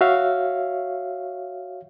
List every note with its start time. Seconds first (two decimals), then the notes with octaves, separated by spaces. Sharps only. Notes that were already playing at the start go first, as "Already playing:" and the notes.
0.01 F#4 C#5 E5 F5